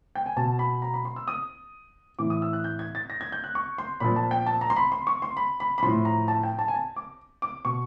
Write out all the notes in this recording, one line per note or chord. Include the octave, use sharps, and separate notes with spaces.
G5
G#5
B2 A5
B5
A#5
B5
C6
E6
D#6
A2 E3 D6
D#6
E6
F#6
G6
G#6
A6
A#6
G#6
G6
F#6
C#6
C6
A#2 F3 B5
A5
G5
A5
A#5
C6
B5
C6
C#6
C6
B5
B5
B5
A2 F3 C6
A#5
A5
G5
A5
G#5
A5
D6
D6
B2 C#6